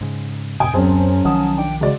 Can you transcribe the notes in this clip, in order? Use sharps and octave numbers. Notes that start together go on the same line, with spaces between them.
G#2 C#3
F2 A2 C3 G5 G#5 D#6 D7
D1 F#2 F#3 C4 C#4 G#4 C5 A5
B1 D#3 F3 F#5 A5 D#6
D4 G5
C#3 G#3 F#4 D5